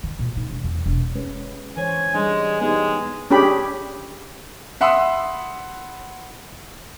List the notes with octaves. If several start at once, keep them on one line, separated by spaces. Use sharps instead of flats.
D#3
A#2
D#4
E1
E2
E1
G#3 C#4 B4
E3 C5 C#5 G#5
G3 G#3 D4
G#3 B3 D#4 G4
C#4 D4 G4 G#4 B5
E5 F#5 B5 C6 D#6 E6